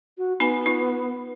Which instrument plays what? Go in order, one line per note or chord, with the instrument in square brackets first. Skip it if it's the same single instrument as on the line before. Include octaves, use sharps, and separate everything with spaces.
[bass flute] F#4
[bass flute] B3 [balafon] D#4 G#5 B5
[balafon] D#4 F4